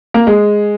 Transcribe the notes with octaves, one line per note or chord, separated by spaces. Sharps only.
A#3
G#3